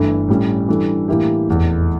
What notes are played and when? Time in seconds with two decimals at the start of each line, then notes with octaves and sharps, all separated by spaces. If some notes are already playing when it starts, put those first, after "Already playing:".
Already playing: G1 G2 E3 A3 E4
0.28 A2 G3 C#4
0.69 E3 G3 D4 A4
1.08 A2 E3 A#3 E4 G4
1.48 F1 E2 E3